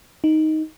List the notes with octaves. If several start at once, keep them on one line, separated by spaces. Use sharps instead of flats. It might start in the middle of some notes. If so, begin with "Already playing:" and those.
D#4